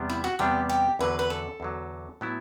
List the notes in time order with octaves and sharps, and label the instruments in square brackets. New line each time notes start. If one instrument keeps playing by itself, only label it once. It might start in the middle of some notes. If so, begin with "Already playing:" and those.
Already playing: [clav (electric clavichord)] E2 C3 G3 B3 D4
[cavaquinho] E4
F#4
[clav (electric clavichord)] E2 C3 G3 B3 D4 [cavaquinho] G4
[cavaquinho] G4
[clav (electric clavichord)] E2 D3 F#3 [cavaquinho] B4
[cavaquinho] B4
A4
[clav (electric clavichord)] E2 D3 F#3
A2 F#3 B3 E4